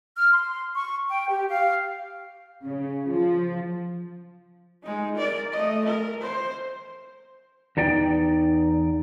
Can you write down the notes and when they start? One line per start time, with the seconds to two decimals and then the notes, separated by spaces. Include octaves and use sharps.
0.17 F6
0.33 C6
0.75 C#6
1.09 G5
1.29 G4
1.49 F5
2.66 C#3
3.11 F3
4.83 G#3 D#4
5.16 A#4 D5
5.52 A3 D#5
5.86 A#4
6.21 C5
7.77 E2 D#4 D5 G5